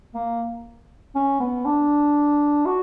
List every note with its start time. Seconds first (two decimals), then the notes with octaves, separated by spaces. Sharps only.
0.15 A#3
1.15 C#4
1.40 B3
1.65 D4
2.66 F#4